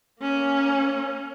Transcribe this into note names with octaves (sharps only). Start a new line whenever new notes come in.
A#3 C#4